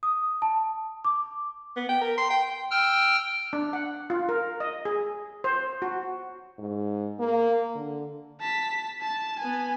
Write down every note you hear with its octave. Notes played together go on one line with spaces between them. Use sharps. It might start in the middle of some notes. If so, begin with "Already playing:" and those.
D#6
A5
D6
B3
G5
A#4
C6
G5
G5 E6 F6
D4
F#5
F4
A#4
D#5
G#4
C5
F#4
G#2
A#3
D3
A5 B6
A5
B3 G#5